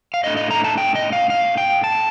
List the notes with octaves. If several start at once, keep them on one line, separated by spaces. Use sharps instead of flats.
F5
A2 A3 D4 D#5
D#5
A#5
A5
G5
D#5
F5
F5
G5
A5